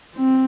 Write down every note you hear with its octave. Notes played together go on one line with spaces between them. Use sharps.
C4